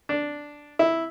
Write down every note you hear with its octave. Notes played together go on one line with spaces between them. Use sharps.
D4
E4